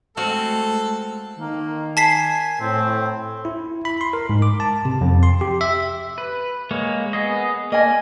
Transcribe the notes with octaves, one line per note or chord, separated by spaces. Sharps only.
G#3 A3 C4 F#4 A4 F5
D#3 A#3
G#5 A5 B6 C7
A2 C4
E4
B5
C6
A#4
G#2
D6
A5
C3
F2
C6
G4
E5
B4
G#3 A#3 C#5
B3 G#4 D#5
A#3 D#5 G#5